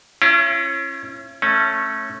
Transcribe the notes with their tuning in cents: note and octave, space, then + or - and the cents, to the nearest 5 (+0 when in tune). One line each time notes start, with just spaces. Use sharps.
C#4 -25 E4 +40
A3 +0 C#4 -20